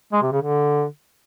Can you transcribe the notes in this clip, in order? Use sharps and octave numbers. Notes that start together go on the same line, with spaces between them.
G#3
C3
C#3
D3